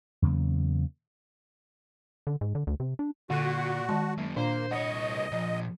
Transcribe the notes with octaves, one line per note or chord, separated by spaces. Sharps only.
E2 C#3 F#3 A#3
D3
G#2
D3
D2
C3
D4
A#2 D3 G3 F#4
D#3 G#3 A5
F#2 A#3
A#2 A#3 D4 C5
C2 C#5 D#5 F#5
A#2 F3